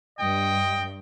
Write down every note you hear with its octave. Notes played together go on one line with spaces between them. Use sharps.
G2 D#5 G5